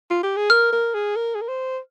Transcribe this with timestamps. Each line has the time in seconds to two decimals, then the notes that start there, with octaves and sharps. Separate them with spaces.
0.10 F4
0.23 G4
0.36 G#4
0.50 A#4 F6
0.72 A#4
0.94 G#4
1.16 A#4
1.35 G#4
1.41 A#4
1.48 C5